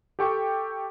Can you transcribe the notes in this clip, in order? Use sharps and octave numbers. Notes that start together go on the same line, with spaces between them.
G4 A4 G5 C#6